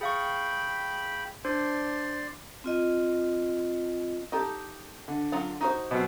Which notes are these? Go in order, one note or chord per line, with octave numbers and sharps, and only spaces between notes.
G#4 F5 G5 B5 C#6
D4 C5 D5 C6
C4 F4 D#5
D#4 G4 A4
D3
F#3 F4 F#5
D#4 F#4 C5
B2 F#3 C4